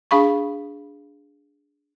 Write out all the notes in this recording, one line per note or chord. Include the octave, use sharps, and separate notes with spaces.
D4 G#4 F5 B5 C#6